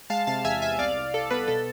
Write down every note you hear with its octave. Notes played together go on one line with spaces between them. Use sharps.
G#3 F5 A5
C3 F5 A5
E2 E5 G#5
E2 E5 G#5
C2 D5 F5
C2
C2 A4
B3 B4
B2 A4